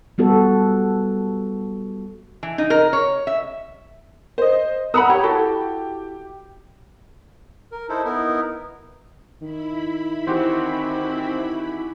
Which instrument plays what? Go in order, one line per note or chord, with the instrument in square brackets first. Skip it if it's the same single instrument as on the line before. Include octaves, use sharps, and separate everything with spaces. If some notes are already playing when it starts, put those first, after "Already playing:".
[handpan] G3 B3 F#4 A4
[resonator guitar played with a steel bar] E3
D#4
A#4
C#5
E5
[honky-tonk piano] C5 D#5
[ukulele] B4 F#5 B5 [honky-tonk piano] A#5 D#6 E6
[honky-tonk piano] G4 [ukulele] C#5
[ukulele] E4 F#4 A4
[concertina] A#4
D#4 E4 A4 C5
B3 D#4 E4 A#4
[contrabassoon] D#3 [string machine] E4 B5
[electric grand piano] E3 F#4 G4 [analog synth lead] C4